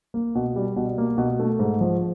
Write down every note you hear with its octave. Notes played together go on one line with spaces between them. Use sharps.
A#3
B2
G3
B2
A#3
B2
A3
G#2
F3